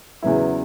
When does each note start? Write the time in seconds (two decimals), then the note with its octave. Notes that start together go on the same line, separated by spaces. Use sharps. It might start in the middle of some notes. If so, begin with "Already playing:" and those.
0.22 E2 C#3 F#3 B3 E4